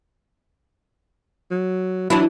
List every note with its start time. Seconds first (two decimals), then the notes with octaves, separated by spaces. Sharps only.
1.51 F#3
2.10 E3 F#3 D4 E4